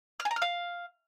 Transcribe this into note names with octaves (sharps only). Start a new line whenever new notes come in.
F6
G#5
A#5
F6
F5